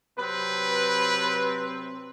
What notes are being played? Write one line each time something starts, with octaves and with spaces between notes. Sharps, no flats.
C3 F#3 C4 B4